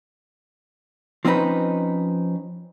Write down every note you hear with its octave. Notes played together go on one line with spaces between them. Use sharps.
F3 C4 C#4 D#4 B4